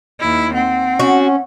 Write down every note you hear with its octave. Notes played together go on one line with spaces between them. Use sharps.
D#2 E4
C4 F#5
C#4 F#4